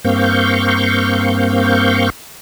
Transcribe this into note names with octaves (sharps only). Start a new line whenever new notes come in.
G2 A#3 C4 F5 C#6 G6